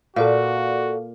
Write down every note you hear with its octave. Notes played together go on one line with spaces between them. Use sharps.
A#2 F#4 A4 D5 F5